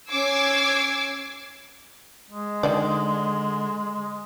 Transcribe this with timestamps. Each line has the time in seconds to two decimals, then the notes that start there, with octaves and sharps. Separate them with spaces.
0.10 C#4 D6 E6 G#6 C7
2.30 G#3
2.63 D3 D#3 F3 D5